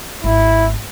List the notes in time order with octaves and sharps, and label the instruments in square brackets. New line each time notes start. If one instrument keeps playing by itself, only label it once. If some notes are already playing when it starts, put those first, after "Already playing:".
[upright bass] G#1 [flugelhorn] E4